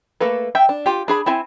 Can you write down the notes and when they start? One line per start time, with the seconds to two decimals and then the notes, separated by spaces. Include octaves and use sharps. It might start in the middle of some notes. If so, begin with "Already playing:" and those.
0.21 A3 A#3 A4 B4
0.55 E5 G5
0.69 D4
0.86 F4 G4
1.08 D4 G#4 B5
1.26 C4 E4 G#5